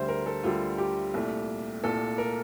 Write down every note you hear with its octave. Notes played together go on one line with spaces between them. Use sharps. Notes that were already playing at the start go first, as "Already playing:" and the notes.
Already playing: D2 D3 G3 C5 E5
A#4
A4
D2 D3 G3 F4
G4
C2 A#2 A3
C2 A#2 A3 A4
A#4